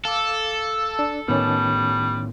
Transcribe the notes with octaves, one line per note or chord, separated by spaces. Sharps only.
A4 F5 D6
D4
A2 D#3 G3 B3 C#4